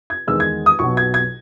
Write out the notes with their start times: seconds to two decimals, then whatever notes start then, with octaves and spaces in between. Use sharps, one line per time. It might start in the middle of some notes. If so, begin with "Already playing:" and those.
0.10 G#6
0.27 E2 D#3 G#3 E6
0.40 G#6
0.66 D#6
0.79 B1 B2 F#3 C#6
0.97 G#6
1.14 G#6